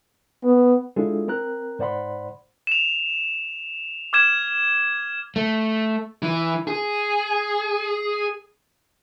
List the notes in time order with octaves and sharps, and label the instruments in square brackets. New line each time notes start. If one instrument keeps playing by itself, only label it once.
[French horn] B3
[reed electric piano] G#3 D4 E4 F4 G#4 A4
C4 A#4 A#5 F#6
G#2 C5 D5 F#5 B5 C6
[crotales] E7 F7
D6 F6 G#6 E7
[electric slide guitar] A3
[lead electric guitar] E3
G#4